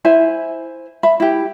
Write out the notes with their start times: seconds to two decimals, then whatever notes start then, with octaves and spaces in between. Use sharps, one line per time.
0.05 E4 C5 E5 G#5
1.03 E5 B5
1.20 E4 G4